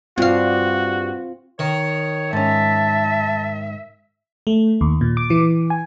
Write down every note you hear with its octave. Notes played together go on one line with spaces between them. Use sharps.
G2 C4 F4 F#4 F5
D#3 C#5
G#2 C#4 E5 A5
A3
D#2
A#2
D6
E3
G#5